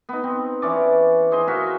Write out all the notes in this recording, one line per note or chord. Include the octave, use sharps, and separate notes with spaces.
B3 D#4
C4
E3 C#4 D5
G#4 C5 D#5 C6
F#4 A#4 E5 F5